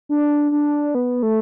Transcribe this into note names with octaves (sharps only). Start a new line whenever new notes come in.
D4
D4
B3
A3